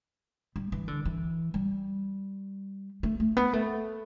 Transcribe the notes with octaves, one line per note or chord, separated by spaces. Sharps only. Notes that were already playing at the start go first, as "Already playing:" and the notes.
G3
E3
D3
E3
G3
A3
A3
B3
A3